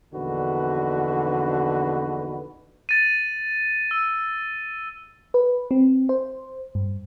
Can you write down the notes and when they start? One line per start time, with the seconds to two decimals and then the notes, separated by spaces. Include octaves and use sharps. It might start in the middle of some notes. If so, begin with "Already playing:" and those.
0.13 A#1 E2 D3 D#4 F#4 B4
2.89 A6 D#7
3.91 E6
5.34 B4
5.71 C4
6.09 C5
6.75 G2